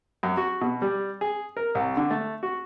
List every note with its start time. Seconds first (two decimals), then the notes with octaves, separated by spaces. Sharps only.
0.23 F#2
0.37 F#4
0.61 B2
0.82 G3
1.21 G#4
1.57 A#4
1.75 C2
1.97 D3
2.11 A3
2.43 F#4